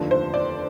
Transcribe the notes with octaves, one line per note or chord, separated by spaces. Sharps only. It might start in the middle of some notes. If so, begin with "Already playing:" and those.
Already playing: F1 D#2 D3 F3
C5
D5